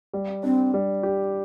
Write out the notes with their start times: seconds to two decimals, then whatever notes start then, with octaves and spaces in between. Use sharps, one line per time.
0.13 G3
0.43 C4 D4
0.74 G3
1.03 G4